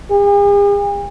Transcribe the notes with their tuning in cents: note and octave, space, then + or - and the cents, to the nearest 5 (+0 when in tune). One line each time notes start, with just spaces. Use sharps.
G#4 -45